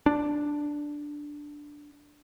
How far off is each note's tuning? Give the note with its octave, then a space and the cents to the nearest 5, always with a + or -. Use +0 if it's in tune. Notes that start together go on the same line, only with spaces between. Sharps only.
D4 +0